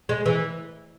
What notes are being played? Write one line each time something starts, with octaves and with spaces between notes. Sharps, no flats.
G#3
E3